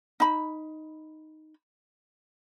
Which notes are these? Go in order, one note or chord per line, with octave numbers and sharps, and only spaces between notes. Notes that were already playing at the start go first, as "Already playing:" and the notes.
D#4 B5